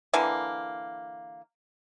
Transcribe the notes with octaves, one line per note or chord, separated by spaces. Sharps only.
D3 E3 A#3